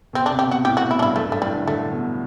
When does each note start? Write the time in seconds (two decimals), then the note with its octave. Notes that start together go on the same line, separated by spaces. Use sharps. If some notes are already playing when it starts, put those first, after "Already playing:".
0.13 B2 C4
0.26 D4
0.30 C3
0.39 G4
0.47 B2
0.51 F#4
0.65 A2 G4
0.77 F#4
0.82 B2
0.91 E4
0.99 G2 D4
1.02 E4
1.16 F#2 A3
1.29 G2
1.32 A3
1.41 A2 G3
1.55 D3
1.67 D3 A3
1.92 B2